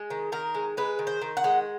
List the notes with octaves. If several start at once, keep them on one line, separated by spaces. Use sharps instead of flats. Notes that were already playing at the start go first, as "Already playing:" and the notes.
Already playing: G#3
D#3
D#3 A#4
G#3
G#3 B4
D#3
C5
D#3
F#5
G#3